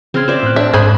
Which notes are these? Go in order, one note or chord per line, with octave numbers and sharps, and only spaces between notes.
C#3 C4 C6 F6 G#6
C5 D5 E5
A2 F#6
D4 E5
G#2 C5 B5 D#6 G#6